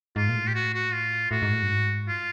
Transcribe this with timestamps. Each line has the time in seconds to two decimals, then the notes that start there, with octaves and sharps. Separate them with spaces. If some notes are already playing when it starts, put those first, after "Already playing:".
0.16 G#2 F4
0.29 A#2
0.36 A2
0.48 G4
0.55 F#4
0.74 F#4
0.93 F4
1.31 A2 F#4
1.42 G#2
1.52 A2
1.62 G2
1.70 G#2
2.08 F4